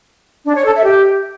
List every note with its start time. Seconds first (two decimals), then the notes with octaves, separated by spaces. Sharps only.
0.45 D4
0.55 C#5
0.65 A4
0.75 E5
0.84 G4